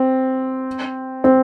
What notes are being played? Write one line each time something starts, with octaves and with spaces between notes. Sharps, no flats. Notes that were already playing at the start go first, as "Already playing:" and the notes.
Already playing: C4
C4